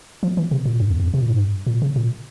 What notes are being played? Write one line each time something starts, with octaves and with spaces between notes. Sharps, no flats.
F3
E3
C3
A#2
G2
E2
F2
C3
A#2
G#2
G2
A#2
C#3
A#2